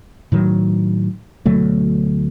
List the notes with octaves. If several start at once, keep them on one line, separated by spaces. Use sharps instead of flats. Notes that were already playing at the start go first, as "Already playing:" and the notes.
A2 D#3 F#3
D2 B2 F#3 A3